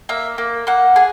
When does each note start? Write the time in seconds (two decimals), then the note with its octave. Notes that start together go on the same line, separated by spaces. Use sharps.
0.09 A#3 E5
0.38 A#3
0.67 A#3 F#5
0.96 G#4